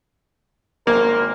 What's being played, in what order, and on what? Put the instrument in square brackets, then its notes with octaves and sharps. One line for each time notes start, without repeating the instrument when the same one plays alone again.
[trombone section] G#1 A#4 C5 [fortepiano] A#3